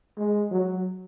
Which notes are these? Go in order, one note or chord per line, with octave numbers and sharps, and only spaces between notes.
G#3
F#3